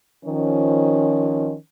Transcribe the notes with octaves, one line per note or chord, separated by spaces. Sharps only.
D#3 F3 C#4